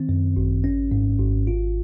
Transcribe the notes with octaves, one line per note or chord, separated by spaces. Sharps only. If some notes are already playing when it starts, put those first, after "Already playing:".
Already playing: D#3 C4
F#2
G#1
C#4
G#2
G#1
F4